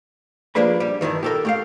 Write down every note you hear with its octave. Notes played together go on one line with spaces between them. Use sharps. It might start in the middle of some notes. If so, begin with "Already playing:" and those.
F3 A#3 D4 G#4 B4 B5
G3
G2 A#2 D#3 E3
G4 A4 A#4
A3 G4 F5